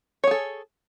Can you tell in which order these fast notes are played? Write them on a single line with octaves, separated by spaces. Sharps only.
C#5 G#4 A4